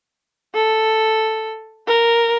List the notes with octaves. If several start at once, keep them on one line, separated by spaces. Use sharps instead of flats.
A4
A#4